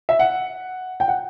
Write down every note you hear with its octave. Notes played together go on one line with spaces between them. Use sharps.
E5
F#5
G5
F#5